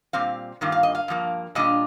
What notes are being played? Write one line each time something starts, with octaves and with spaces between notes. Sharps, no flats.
A#2 G3 C4 F5
G2 D#3 A#3 F4
F5
D#5
F5
G2 F3 A#3
A#2 G3 D4 F4 D#5